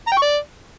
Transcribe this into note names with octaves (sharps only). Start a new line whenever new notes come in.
A#5
G5
C#6
D5